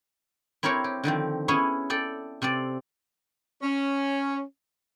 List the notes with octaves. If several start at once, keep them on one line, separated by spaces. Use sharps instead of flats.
C4 E4 G4 A#4 C#5
G4
D3 D#3 F3 C4
B3 C#4 E4 G#4 C#5
A4 D5 G5
C3 C4 A4 D5
C#4